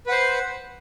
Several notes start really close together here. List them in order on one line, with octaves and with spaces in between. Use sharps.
B4 F#5 C5